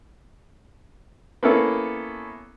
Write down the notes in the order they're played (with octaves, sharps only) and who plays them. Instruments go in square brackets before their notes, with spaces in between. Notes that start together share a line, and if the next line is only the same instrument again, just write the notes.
[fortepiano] A#3 B3 C#4 E4 A4